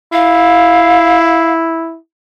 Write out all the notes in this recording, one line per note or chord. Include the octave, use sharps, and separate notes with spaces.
E4 F5